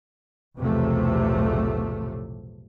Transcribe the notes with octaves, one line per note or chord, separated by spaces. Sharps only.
B1 E2 A2 C3 F3 A3